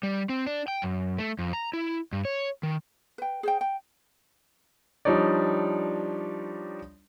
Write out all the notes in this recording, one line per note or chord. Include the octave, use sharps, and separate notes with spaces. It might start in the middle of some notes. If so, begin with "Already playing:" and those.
G3
C4
D4
G5
F#2
A3
F2
A#5
E4
G2
C#5
D#3
B4 G5
G#4 C5 G5
G5
F3 G3 D4 D#4 C#5 D5